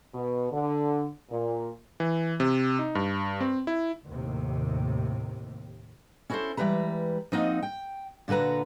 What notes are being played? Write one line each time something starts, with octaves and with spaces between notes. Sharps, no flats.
B2
D3
A#2
E3
C3
D#4
G2
C4
E4
D#2 A2 C3
C#4 E4 F#4 G#4 A4 C5
E3 G3 G#3 B4 A#5
F3 A#3 C4 D#4 F#4 D#5
G5
A#2 D3 F#4 B4 A#5